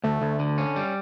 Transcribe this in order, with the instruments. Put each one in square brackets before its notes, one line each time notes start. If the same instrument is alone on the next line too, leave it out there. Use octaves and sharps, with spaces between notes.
[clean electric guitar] D2 [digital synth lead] A3
[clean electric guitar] D2
D3
C#4
G3